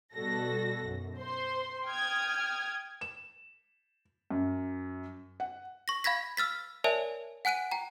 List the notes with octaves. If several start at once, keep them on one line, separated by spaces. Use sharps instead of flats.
B2 G3 F#4 A4 A#6
B1 F#2
C5 C6
G5 D#6 F6 G#6
E7
F#2
F#5
C#6 A#6
F5 B5 G#6 A#6 B6
E6 F6 A6 B6
A#4 C#5 D5 E5 G#5 A5
F#5 G#5 F#6 D7 D#7
G5 A#5